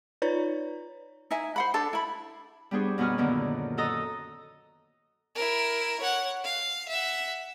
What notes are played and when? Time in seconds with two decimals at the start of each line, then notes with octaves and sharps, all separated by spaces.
0.22 D#4 F4 B4 C#5 D5 A#5
1.31 D#4 E4 E5 G#5
1.56 C5 F#5 B5
1.74 D4 A4
1.93 E4 B5
2.71 G3 B3 D4 G#4 C5 C#5
2.98 F#2 B2 B3 F#4 G#5 F6
3.18 F#2 A#2 D3 D#3 B3
3.77 F#4 A4 D#5 A#5 D#6
5.36 E4 A#4
6.00 C#5 F#5
6.44 F5
6.89 E5 F#5